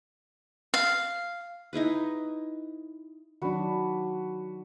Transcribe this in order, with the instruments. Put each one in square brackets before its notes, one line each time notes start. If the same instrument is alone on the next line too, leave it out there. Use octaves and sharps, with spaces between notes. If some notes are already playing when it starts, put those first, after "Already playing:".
[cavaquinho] F5
[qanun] D#4 E4 G#4 B4
[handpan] D#3 F#3 D4 [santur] F#4 B4